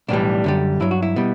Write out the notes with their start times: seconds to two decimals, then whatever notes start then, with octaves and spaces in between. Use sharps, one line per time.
0.08 B1 A2 E3 G3 D4
0.44 F#2 D3 G3
0.80 G2 F#3 E4
0.91 F#4
1.02 E4
1.16 B2 G3